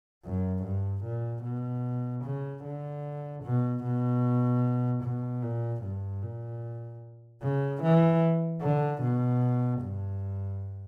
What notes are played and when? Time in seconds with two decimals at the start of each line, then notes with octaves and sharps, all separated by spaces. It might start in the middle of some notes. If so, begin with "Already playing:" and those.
0.25 F#2
0.64 G2
1.04 A#2
1.44 B2
2.24 C#3
2.64 D3
3.44 B2
3.84 B2
5.04 B2
5.43 A#2
5.83 G2
6.22 A#2
7.42 C#3
7.83 E3
8.62 D3
9.02 B2
9.82 G2